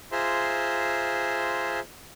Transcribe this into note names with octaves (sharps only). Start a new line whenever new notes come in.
F4 G#4 C5 E5 A#5 C6